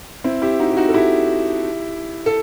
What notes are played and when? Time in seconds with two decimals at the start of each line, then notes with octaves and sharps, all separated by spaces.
0.24 C4 E4
0.42 E4 G4
0.59 D#4 F#4
0.72 G4
0.77 D#4 F#4
0.89 A4
0.94 E4 G4
2.26 A4